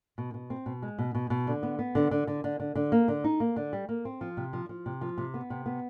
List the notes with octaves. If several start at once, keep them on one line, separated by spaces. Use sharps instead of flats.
B2
B2
C4
B2
G#3
B2
B2
B2
D3
B3
B3
D3
D3
D3
D3
D3
D3
A#3
D3
D#4
A#3
D3
G3
A#3
C4
F3
C3
F3
F3
C3
F3
C3
B3
C3
B3